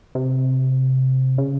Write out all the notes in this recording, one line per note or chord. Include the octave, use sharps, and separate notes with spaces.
C3
C#3